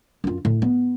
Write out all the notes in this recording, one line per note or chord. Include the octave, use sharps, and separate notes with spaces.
F#2 F4
A2
B3